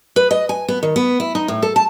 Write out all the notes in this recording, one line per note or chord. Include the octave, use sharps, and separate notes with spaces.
B4
D#5
G#5
B3
D#3
B3
E4
D#4
A2
A4
A5